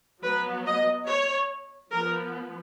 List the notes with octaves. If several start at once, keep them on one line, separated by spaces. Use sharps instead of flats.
F#3 B3 B4
D#5
C#5
F3 B3 A#4